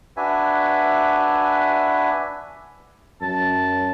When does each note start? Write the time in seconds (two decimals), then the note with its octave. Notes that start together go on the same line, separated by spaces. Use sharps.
0.17 D4 F#4 B4 E5 G#5
3.21 F#2 A5